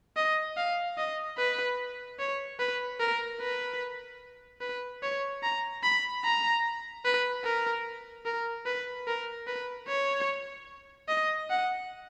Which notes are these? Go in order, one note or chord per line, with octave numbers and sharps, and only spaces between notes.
D#5
F5
D#5
B4
C#5
B4
A#4
B4
B4
C#5
A#5
B5
A#5
B4
A#4
A#4
B4
A#4
B4
C#5
D#5
F#5